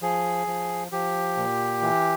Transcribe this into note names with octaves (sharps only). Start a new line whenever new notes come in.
F3 G#4
F3
F3 G4
A#2
E3